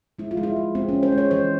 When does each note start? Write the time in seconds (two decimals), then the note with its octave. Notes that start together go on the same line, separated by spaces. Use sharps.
0.19 G#3 E4
0.31 F4
0.37 G#3
0.43 E4
0.56 G#3
0.75 G#3 C4
0.89 G#3 C#4
1.03 C5
1.12 G#3
1.18 C#5
1.31 E3 C5